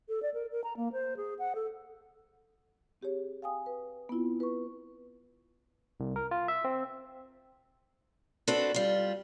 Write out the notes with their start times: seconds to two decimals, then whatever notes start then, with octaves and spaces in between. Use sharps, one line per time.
0.09 A4
0.22 D5
0.34 A#4
0.52 A#4
0.64 A#5
0.77 A#3
0.93 C5
1.17 G#4
1.39 F#5
1.55 A4
3.01 C4 G4 G#4 C#5
3.42 F5 G5 G#5 D#6
3.66 B4
4.09 B3 C4 E4 F4
4.40 B4 C#6
6.00 C2
6.16 A#4
6.31 F4
6.48 E5
6.65 C4
8.48 C4 D4 F#4 A4 B4
8.74 G3 F4